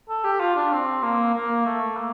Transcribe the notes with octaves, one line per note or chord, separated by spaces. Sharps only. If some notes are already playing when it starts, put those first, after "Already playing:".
A4
G4
F4
D4
C4
A#3
A#3
A3
A#3